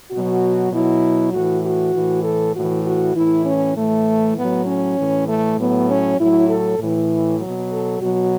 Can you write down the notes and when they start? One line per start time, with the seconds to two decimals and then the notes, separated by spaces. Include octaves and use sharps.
0.11 B2 F#3 F#4
0.71 B2 F#3 E4
1.32 A2 E3 F#4
1.63 F#4
1.94 A2 E3
2.23 A4
2.53 A2 E3 F#4
2.84 F#4
3.14 A2 E3 E4
3.45 C#4
3.76 A2 E3 A3
4.36 A2 F#3 B3
4.66 C#4
4.97 A2 E3
5.28 A3
5.58 A2 F#3 B3
5.88 C#4
6.18 A2 F#3 E4
6.48 A4
6.79 A2 E3
7.40 B2 F#3
7.70 A4
8.00 B2 F#3 F#4